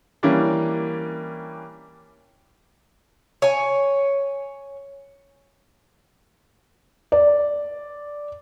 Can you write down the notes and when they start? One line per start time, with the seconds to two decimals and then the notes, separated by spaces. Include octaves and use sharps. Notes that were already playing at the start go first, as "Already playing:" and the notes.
0.23 E3 G3 A#3 C#4 D4
3.42 C#5 G#5
7.12 D5